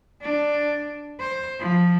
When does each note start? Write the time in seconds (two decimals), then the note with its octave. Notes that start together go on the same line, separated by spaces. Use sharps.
0.22 D4
1.20 C5
1.60 F3